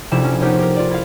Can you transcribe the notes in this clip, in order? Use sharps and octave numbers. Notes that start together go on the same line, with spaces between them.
F1 A#1 C3 E4 D6 E7
C#4
B3 D#4 G4 A#4 C5 C#5
G4 A#4
F4 D5
E4 F5